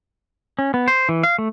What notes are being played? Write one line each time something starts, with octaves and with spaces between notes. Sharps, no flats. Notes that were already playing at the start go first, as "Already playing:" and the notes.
C#4
B3
C5
E3
F5
A3